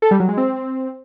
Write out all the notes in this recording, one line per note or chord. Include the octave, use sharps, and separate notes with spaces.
A4
G3
F#3
G#3
C4